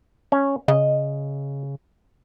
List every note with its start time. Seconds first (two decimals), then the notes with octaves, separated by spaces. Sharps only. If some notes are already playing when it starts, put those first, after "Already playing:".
0.32 C#4
0.68 C#3 D#5